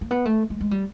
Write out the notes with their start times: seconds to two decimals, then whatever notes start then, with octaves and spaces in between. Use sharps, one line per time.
0.01 A#3
0.11 B3
0.25 A3
0.50 G#3
0.60 G#3
0.71 G3